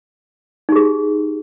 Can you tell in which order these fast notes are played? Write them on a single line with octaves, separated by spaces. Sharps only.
D#4 G4 G#4